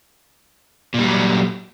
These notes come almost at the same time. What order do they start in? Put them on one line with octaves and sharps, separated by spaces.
A#2 G3 F#3